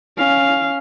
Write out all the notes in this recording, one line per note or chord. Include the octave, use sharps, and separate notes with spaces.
C#4 F5